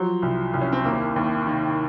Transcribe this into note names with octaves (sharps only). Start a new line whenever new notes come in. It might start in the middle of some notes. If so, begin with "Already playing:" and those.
Already playing: F3 F#3
C2
C2
C#4
C4
D#2 A#3
D#2
D#3